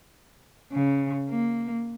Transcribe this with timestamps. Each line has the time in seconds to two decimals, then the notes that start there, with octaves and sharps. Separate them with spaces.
0.73 C#3
1.29 A#3